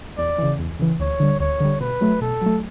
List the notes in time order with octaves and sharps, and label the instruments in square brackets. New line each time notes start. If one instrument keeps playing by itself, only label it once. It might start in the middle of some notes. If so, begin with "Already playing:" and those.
[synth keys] E2 [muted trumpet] D5
[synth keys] C#3 E3
E2
C#3 E3
[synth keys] D2 [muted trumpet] C#5
[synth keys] D3 G3
[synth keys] D2 [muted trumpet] C#5
[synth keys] D3 G3
[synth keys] B2 [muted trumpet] B4
[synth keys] F#3 A3
[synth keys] B2 [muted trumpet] A4
[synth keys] F#3 A3